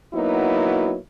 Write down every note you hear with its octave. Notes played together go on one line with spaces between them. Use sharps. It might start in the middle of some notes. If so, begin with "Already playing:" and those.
F#3 A#3 B3 D#4 E4 F#4